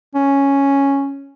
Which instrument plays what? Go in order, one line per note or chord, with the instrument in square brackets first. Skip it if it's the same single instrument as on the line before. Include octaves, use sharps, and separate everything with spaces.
[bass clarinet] C#4